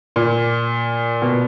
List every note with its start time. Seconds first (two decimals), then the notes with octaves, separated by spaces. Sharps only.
0.16 A#2
1.22 B2